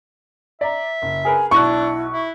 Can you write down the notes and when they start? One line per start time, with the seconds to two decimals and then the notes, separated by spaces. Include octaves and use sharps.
0.61 D5 E5 A#5
1.02 F#1
1.25 G#4 A#4 B4 G#5
1.51 B1 D4 E4 C#6 F#6
2.11 E4